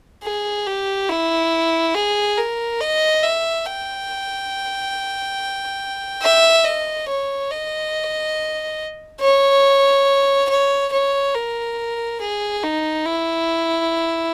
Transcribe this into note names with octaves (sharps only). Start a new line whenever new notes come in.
G#4
G4
E4
G#4
A#4
D#5
E5
G5
E5
D#5
C#5
D#5
C#5
C#5
C#5
A#4
G#4
D#4
E4